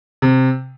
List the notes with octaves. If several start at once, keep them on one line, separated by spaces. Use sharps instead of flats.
C3